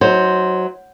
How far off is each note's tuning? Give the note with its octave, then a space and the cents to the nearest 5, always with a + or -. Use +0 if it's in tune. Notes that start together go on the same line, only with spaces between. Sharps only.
F#3 +0 D#4 +35 C5 +0